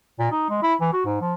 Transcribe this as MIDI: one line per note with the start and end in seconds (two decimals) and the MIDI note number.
0.19 0.27 46
0.31 0.45 63
0.50 0.60 56
0.63 0.74 64
0.81 0.90 52
0.93 1.03 66
1.06 1.16 44
1.21 1.34 53